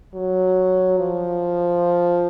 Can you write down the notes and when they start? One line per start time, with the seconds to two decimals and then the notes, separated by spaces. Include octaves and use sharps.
0.14 F#3
0.99 F3